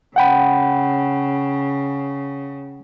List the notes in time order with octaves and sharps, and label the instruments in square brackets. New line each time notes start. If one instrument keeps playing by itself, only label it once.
[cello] C#3 [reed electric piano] F#5 G5 B5